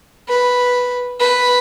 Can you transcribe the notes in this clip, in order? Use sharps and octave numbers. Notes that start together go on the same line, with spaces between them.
B4
B4